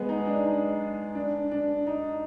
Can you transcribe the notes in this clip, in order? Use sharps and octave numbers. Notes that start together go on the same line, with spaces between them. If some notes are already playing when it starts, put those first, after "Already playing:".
Already playing: G#3 B3
D#4
D4
D#4
D4
D4
D#4